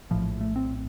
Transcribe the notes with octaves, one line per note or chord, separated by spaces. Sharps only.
A#1 A2 F3
A3
C4